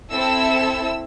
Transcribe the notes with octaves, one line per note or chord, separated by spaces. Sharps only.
C4 E4 A4 E6